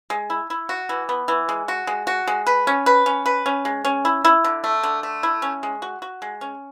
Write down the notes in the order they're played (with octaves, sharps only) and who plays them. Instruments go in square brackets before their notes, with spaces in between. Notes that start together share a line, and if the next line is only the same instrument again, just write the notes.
[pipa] G#3
E4
E4
F#4
E3
B3
E3
G#3
F#4
G#3
F#4
G#3
B4
C#4
B4
C#4
B4
C#4
G#3
C#4
E4
E4
D3
A3
D3
A3
E4
C#4
G#3
F#4
F#4
G#3
C#4